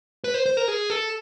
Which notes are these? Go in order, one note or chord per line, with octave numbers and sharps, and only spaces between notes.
B4
C5
C5
A#4
G#4
A4